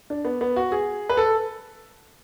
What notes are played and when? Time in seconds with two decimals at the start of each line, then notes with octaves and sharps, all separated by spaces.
0.10 D4
0.25 B3
0.41 B3
0.56 F#4
0.72 G#4
1.09 B4
1.17 A4